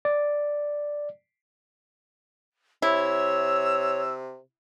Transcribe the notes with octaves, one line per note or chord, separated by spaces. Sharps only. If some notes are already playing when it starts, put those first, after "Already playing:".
D5
C3 E4 C#5 E6